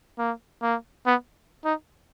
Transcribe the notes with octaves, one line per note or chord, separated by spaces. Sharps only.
A#3
A#3
B3
D#4